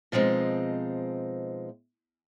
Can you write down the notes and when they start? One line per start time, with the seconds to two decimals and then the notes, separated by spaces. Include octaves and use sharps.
0.12 B2 F3 G#3 C4 D#4